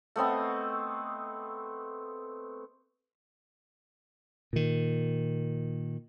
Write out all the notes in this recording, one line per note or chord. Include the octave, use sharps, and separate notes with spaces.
A3 B3 C4 D#5
A#2 D#3